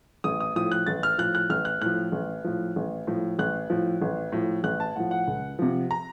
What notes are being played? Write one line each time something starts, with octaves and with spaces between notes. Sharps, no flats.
A1 D#6
D#6
A2 F3 D#6
F#6
A1 A6
F6
A2 F3 F#6
F#6
A1 F6
F#6
A2 F3 F#6
A1
A2 F3
A1
A2 F3
A1 F#6
A2 F3
A1
A2 F3
A1 F#6
A5
A2 F3 F#5
F#5
C#2
C3 F3
A#5